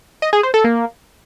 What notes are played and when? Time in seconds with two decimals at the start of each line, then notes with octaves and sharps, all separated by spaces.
0.22 D#5
0.33 G#4
0.43 C5
0.54 A4
0.64 A#3